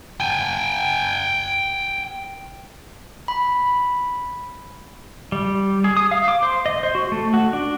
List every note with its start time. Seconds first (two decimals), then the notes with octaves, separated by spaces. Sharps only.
0.20 G5 G#5
3.28 B5
5.32 G3
5.84 G#4
5.97 D#6
6.11 F5
6.28 D6
6.43 C5
6.66 D#5
6.83 C5
6.95 F#4
7.12 A3
7.34 F#4
7.53 D4